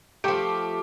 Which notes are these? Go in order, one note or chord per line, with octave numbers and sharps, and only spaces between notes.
F3 A3 G4 G5